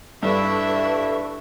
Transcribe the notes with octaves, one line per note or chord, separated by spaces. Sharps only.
G2 D4 E4 A4 B4 E5 C#6